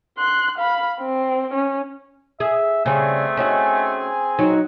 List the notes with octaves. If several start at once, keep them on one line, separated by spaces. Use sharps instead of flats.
C6 F#6
F5 B5
C4
C#4
G#4 E5
C#3 G3 A3 C4 G#4 G#5
C#4 D#4 F#4
F#3 D#4